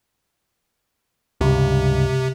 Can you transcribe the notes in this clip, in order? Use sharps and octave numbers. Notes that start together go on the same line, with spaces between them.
C#2 G2 C3